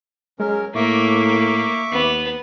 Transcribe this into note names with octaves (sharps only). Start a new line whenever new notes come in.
F#3 G#3 C#4 A#4
A2 A#3 E5 C#6 D6
D#2 B3